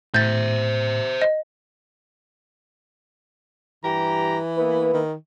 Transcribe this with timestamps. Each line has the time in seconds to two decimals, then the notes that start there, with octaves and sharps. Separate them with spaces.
0.14 A2 C5 E5 G6 A6
1.22 D#5
3.84 G2 E3 G4 A#5
4.58 A#3 B3 E4 B4
4.94 D#3